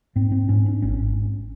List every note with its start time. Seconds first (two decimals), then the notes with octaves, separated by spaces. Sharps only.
0.16 G#2 C4
0.32 C4
0.49 G#2 C#4
0.66 D4
0.82 G#1 C#4